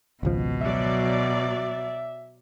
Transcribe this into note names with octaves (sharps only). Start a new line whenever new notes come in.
G#1 C#2 B2 F3
F#3 D5 E5